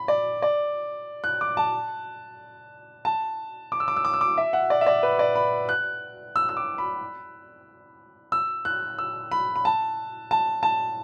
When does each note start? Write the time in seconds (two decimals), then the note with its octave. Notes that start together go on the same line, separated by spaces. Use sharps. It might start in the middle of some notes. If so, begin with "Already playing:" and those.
Already playing: B5
0.08 D5
0.42 D5
1.24 F#6
1.41 D6
1.57 A5
3.05 A5
3.72 D6
3.80 E6
3.88 D6
3.96 E6
4.05 D6
4.13 E6
4.21 D6
4.38 E5
4.53 F#5
4.70 D5
4.81 E5
4.87 D5
5.03 B4
5.19 D5
5.36 B5
5.69 F#6
6.36 E6
6.49 E6
6.57 D6
6.78 B5
8.32 E6
8.65 F#6
8.98 E6
9.31 B5
9.56 B5
9.65 A5
10.31 A5
10.63 A5